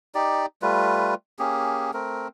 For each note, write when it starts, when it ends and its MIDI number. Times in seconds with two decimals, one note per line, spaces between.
0.15 0.46 63
0.15 0.46 67
0.15 0.46 74
0.62 1.14 55
0.62 1.14 57
0.62 1.14 65
0.62 1.14 71
1.39 1.91 58
1.39 1.91 61
1.39 1.91 67
1.39 1.91 68
1.94 2.28 57
1.94 2.28 60
1.94 2.28 70